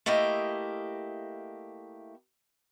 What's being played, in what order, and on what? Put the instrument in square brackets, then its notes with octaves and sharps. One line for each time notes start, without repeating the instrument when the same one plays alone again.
[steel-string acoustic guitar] A3 A#3 E4 G4 D#5